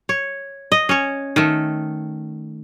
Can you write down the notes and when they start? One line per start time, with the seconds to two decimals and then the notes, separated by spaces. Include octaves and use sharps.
0.09 C#5
0.72 D#5
0.89 C#4 C#5
1.36 D#3 A3